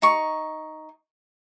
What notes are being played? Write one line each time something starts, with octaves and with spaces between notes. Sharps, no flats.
D#4 C#6